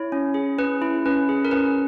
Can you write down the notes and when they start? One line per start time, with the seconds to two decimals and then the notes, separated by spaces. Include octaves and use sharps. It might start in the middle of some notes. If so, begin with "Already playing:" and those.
Already playing: E4 C#5
0.12 C#4
0.34 G#4
0.58 C#4 B4
0.82 E4
1.06 C#4 B4
1.29 G#4
1.45 A#4
1.51 C#4 B4